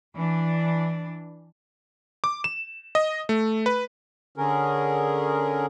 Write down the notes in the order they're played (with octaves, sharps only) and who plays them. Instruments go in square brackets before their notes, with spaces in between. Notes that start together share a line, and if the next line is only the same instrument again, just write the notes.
[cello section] E3 D4
[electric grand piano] D6
E7
D#5
A3
B4
[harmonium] D3 C#4 G#4 A#4